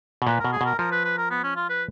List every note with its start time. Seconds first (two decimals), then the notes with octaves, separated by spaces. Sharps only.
0.22 B2
0.27 A#2 B4
0.40 B2 A#4
0.53 G#4
0.61 B2 A#4
0.78 F3 A#4
0.92 B4
1.05 B4
1.17 A#4
1.30 B3
1.44 C#4
1.56 F4
1.70 B4